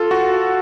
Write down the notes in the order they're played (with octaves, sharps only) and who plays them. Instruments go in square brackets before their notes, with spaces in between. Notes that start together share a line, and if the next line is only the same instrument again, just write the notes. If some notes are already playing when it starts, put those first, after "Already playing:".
Already playing: [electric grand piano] F4 A4
F#4